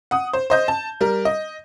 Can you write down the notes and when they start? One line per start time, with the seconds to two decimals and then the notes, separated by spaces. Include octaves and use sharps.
0.11 F#5 D#6
0.33 C5
0.50 C5 D#5 G6
0.68 A5
1.01 G3 A#4
1.25 D#5